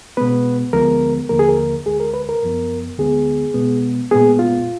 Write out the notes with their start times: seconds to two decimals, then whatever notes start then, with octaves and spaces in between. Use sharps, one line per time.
0.17 B2 G#3 B3 B4
0.73 D2 D3 F3 G#3 B3 A#4
1.29 D#2 D3 F3 A#3 A#4
1.39 G#4
1.49 A#4
1.86 D2 D3 G#3 G#4
2.00 A#4
2.14 B4
2.29 A#4
2.43 F#2 F3 B3
2.99 D2 D3 G#3 B3 G#4
3.54 B2 G#3 B3
4.11 A#2 G#3 B3 G#4
4.39 F4